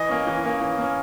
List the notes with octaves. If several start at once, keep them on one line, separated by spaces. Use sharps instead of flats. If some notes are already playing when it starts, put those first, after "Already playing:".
Already playing: E3 D#5
A#3 C#4
E3
A#3 C#4
E3
A#3 C#4